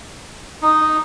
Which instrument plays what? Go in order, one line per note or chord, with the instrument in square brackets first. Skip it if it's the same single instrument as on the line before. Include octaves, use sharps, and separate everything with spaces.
[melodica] D#4